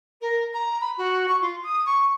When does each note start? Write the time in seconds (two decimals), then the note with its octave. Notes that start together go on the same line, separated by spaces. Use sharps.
0.21 A#4
0.53 A#5
0.81 B5
0.97 F#4
1.28 C#6
1.41 F4
1.63 D#6
1.86 C#6